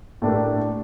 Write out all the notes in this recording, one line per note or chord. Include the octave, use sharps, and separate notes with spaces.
A2 A3 D4 G4 A#4